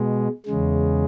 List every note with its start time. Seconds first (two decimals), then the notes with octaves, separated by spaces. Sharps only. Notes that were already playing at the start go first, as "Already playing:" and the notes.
Already playing: B2 G#3
0.46 E2 C#3 G#3